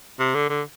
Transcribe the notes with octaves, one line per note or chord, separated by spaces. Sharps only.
C3
D3
D3